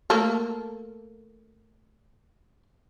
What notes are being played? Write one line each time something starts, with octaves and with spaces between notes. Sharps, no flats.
A3 A#3 A4